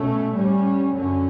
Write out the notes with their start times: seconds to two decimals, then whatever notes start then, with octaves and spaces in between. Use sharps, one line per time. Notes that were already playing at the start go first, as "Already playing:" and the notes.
Already playing: B2 A3 C#4
0.35 A2 G3 C#4
0.93 F#2 D3 F#3 C#4